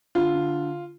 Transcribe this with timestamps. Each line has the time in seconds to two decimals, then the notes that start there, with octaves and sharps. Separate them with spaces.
0.15 D3 F4
0.34 D3